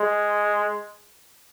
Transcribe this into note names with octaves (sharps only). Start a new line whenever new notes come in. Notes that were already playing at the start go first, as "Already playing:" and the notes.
Already playing: G#3